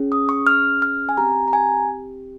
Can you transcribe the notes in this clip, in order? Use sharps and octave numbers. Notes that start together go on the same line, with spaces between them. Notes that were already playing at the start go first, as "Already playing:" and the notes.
Already playing: C#4 G#4
D#6
C#6
F6
F6
G#5
C4 G4 A#5
A#5
G#5